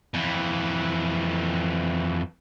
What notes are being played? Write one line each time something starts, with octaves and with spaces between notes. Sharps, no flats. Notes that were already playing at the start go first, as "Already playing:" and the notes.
F2 E3